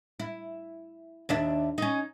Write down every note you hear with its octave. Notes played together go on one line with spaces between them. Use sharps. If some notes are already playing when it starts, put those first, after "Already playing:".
E4
D#2 D4 E5
C#4 D#4